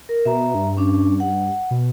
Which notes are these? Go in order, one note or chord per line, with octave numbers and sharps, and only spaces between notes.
A#4
B2 E5 A#5
G2
C#4 D4
F#5
B2